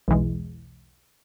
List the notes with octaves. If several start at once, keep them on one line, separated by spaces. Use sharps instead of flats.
B1 E2 E3 G#3